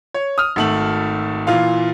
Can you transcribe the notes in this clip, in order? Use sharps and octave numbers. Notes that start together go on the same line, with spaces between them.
C#5
D#6 F6
G#1 A3 F#7
A#2 E3 F4 F5